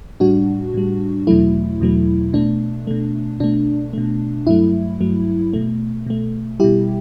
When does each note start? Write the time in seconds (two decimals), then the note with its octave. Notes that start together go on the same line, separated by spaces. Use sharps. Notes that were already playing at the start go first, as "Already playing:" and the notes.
0.20 A2 G3 D4 F#4
0.74 A2 G3
1.27 E2 B2 F#3 A3 E4
1.80 E2 B2 F#3 A3
2.33 B2 A3 D4
2.87 B2 A3
3.40 B2 A3 D4
3.93 B2 A3
4.47 G2 F#3 A3 E4
5.01 G2 F#3 A3
5.53 B2 A3
6.06 B2 A3
6.60 B2 G3 E4 G4